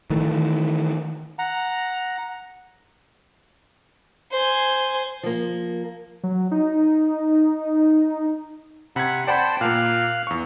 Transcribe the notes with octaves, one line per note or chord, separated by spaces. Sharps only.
D#3 E3 A3
F#5 A#5
C5 G#5
F3 A#3
F#3
D#4
C3 F#5 B5 G#6
C5 D5 F#5 G5 A5 B5
A#2 A#3 F5 F6 F#6
E2 C#6